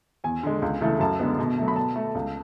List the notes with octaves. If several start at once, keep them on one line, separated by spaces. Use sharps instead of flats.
E2 G#5
D3 G#3
C#2
C#3 E3 A3
F#2 A5
D3 G#3 B3
B2
F#3 A3
B5
B2 A5
A3
C#2